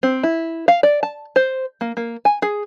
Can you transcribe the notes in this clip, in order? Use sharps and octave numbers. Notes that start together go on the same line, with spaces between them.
C4
E4
F5
D5
A5
C5
A#3
A#3
G#5
G#4